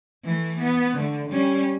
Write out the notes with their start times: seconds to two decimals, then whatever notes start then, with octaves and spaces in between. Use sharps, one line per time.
0.24 E3 A3
0.59 B3
0.94 D3 A3
1.30 G3 C#4